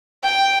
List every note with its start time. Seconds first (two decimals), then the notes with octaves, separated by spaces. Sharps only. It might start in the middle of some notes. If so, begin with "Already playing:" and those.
0.23 G5